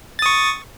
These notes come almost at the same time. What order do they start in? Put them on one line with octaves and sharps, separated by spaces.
A6 D#6 C#6